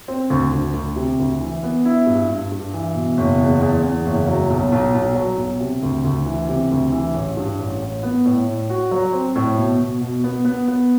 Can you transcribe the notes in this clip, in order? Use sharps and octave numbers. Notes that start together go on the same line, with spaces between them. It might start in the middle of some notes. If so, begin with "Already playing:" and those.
C4
D2
D2
D2
C3
D2
E3
B3
E4
G2
G2
G2
E3
B2
F#1
E2
E2
E2
F#1
F#3
B1
B1
B1
F#3
B1
C3
D2
D2
E3
C3
D2
E3
A1
G2
A1
A1
B3
A2
A2
F#4
F#3
C4
A2
B2
B2
B2
B3
B3
B3